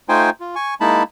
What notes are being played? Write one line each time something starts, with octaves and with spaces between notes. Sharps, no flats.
A3 D#4 F4 C5 G5 G#5
F4
G#5 C#6
G#3 A#3 D#4 E4 A5 B5